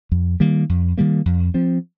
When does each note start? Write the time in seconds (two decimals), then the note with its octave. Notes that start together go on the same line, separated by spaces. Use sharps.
0.12 F2
0.40 D#3 G3 A#3
0.69 F2
0.98 D#3 G3 A#3
1.26 F2
1.54 F3 C4